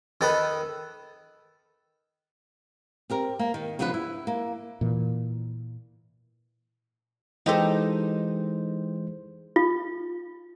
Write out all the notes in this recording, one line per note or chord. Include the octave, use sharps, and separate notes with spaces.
D#3 A4 B4
C4 G4 A#4
A#3
D#3
C#3 F3 B3 D4 B4
E4
A#3
A#2 E3
E3 G#3 D#4 G4 A4 C5
F4